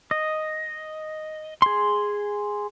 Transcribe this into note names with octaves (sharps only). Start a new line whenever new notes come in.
D#5
G#4 C6